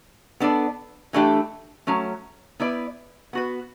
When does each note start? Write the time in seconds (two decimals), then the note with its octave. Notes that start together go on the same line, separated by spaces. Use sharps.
0.40 B3 D4 A4 D5
1.13 E3 A3 D4 G4
1.87 F#3 A3 C#4
2.60 B3 E4 B4 D5
3.33 B3 F#4 B4